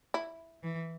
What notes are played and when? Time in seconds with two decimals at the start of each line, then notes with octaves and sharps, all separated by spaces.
0.14 E4
0.63 E3